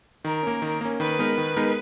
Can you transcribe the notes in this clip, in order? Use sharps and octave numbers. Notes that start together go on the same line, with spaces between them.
D#3 A#4
A#3 C#4
D#3
A#3 C#4
D#3 B4
G#3 B3 D#4 A#4
D#3
G#3 B3 D#4 A#4